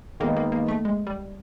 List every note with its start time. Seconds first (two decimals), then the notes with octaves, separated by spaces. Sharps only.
0.20 D#3 G#3 A#3 B3 D#4
0.36 A#3
0.52 A#3
0.68 A3
0.85 G#3
1.07 G3